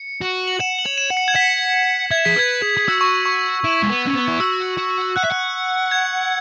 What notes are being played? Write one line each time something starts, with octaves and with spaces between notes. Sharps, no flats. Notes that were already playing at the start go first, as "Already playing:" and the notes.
Already playing: C#7
F#4
F#7
F#5 E7
F#7
C#5
E7
F#5
C#7
G#6
F#5 B6
E5 G#6
G#4 B6
B4 G#6
G#4
G#4
F#4 E6
C#6
C#6
E4
G#3
B3
C#4
B3
E4
F#4 E6
F#4
F#5 F#6
E5
F#5
G#6